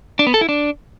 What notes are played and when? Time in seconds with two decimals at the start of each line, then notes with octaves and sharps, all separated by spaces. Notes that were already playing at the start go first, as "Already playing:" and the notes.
0.19 D4
0.27 B3
0.34 A4
0.41 E4
0.49 D4